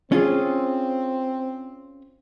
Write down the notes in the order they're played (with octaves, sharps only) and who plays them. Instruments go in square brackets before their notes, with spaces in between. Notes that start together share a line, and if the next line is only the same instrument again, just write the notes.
[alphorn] C4 [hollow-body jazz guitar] C#4 F4 G#4